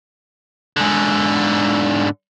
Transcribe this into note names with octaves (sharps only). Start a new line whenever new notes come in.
G#2 D3